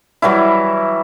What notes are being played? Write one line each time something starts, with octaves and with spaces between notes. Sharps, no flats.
E3 F#3 G3 E4